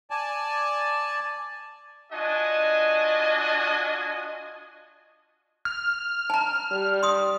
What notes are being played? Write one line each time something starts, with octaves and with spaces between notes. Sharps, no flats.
D5 G#5 A5
D4 F4 F#4 D#5 G#5
F6
A5 A#5
G3
C6 D#6